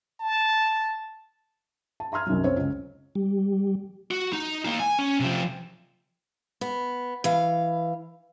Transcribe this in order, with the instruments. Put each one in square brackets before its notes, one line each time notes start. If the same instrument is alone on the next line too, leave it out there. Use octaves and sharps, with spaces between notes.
[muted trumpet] A5
[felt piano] A5
E5 A#5 C6 F6 G#6
C2 F#2 D#3 F#3
C4 C5 C#5
C#2
[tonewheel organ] G3
[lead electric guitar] F#4
D#4
A#3 D#4
G#5
C#4
C3 F3
[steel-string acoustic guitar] B3
E3 F5